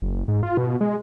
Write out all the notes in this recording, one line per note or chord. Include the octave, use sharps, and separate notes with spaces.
F#1
G#2
F4
B2
G#3